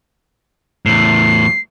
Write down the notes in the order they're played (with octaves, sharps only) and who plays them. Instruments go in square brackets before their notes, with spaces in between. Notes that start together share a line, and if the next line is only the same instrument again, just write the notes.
[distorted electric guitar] E2 A2 [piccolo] C7